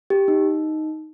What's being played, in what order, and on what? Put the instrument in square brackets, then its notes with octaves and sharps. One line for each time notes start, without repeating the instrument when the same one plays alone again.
[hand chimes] G4
D#4